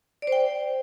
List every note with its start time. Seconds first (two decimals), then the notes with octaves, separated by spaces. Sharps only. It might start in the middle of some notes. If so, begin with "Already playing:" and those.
0.22 D5
0.27 C5
0.32 G5